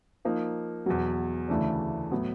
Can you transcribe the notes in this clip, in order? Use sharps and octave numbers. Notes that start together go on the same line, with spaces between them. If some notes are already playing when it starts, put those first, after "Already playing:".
F3 A#3 D#4
E2 B2 F#3
D2 C#3 E3 A3 D4
A2 F#3 B3